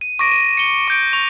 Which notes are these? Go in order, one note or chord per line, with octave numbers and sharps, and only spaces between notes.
D#7
C#6 D6 A#6 D7 D#7
D#7
C#7 G7
C#6 G6 D7
C#6 F7